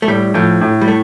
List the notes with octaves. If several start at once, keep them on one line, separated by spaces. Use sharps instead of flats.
A3
A2 G3
A2 F3
A2
G3
A3